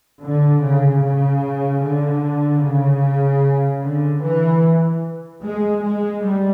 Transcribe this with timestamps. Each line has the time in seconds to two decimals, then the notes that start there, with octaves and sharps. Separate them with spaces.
0.22 D3
0.62 C#3
1.02 C#3
1.82 D3
2.63 C#3
3.82 D3
4.23 E3
5.43 G#3
5.83 G#3
6.22 G3